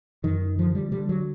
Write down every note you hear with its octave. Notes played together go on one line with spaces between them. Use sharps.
F#2 D#3
D3 F3
G3
D3 G3
F#3